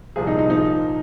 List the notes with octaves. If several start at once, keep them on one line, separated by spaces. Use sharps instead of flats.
C2 A#2 F3 G#4
D#4
D#4
A#2 F3 D#4